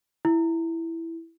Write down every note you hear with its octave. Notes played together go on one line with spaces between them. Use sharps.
E4